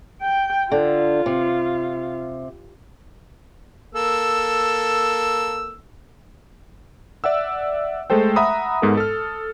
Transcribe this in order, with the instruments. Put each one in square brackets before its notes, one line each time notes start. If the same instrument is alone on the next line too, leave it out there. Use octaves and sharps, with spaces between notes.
[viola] G5
[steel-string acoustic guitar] D3 [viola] F4
[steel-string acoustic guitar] C3
[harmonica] A#3 A4 E6
[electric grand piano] D5 E5 F#5 E6
G#3 A3 A4 C5 G5
E5 F#5 A#5 B5 D#6
G#2 G#3 B3 A4 A#4
A4 F6